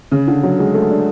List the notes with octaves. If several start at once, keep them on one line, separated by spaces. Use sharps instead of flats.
C#3
D3
F#3
G#3
A3
D4